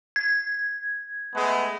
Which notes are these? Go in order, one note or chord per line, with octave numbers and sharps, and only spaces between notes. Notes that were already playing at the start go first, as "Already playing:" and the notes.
G#6
G#3 A3 B3